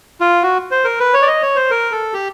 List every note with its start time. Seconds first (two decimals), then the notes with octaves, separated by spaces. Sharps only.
0.21 F4
0.43 F#4
0.71 C5
0.84 A#4
1.00 B4
1.14 C#5
1.22 D5
1.27 D#5
1.42 C#5
1.56 C5
1.71 A#4
1.92 A4
2.13 G4